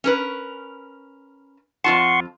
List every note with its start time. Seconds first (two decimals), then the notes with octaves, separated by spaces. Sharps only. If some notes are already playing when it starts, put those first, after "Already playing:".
0.04 C#4 A#4 B4
1.84 F2 F4 F#5 A5 C6 C#6